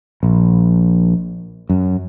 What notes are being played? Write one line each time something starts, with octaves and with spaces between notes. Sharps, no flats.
A#1
F#2